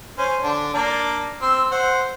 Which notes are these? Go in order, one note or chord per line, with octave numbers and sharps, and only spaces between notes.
C#4 C5
D3 D4
A#3 D4 D5
C4 C6 E6
C5 F#5